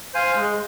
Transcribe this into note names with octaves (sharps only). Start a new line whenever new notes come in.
C5 F5 G#5
G#3